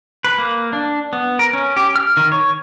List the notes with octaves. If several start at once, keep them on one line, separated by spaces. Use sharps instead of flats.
B4
A#3
D4
B3
A#4
C#4
G4
F6
D#3
C#5